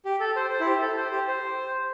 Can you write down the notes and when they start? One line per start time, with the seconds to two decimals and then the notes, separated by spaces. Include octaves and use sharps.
0.05 G4
0.20 A4
0.36 C5
0.50 C5
0.60 E4
0.66 G4
0.81 A4
0.97 C5
1.12 G4
1.28 C5